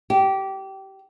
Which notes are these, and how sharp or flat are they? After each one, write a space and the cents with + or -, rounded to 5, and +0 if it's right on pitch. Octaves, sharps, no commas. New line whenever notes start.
G4 -20